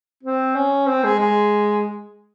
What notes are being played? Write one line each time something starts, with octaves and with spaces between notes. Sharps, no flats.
C4
C#4
C4
G#3
G#3